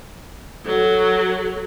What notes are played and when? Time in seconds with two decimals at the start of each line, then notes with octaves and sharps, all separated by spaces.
0.66 F#3 A4